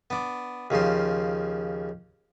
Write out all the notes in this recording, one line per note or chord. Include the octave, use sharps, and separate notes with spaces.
B3 D4
D#2 C#3 F3 C6